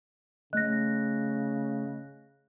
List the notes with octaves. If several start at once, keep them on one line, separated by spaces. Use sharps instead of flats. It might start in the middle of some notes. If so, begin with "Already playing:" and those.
C#3 A3 D#5 F#6 A#6